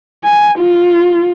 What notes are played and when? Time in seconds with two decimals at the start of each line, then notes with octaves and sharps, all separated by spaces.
0.24 G#5
0.59 F4